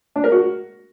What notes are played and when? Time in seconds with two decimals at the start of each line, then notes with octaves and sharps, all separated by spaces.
0.16 D4
0.24 A#4
0.32 F#4